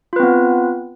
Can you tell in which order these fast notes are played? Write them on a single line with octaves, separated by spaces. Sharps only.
F4 B4 C4 B3